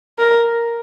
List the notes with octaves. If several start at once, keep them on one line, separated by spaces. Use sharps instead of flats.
A#4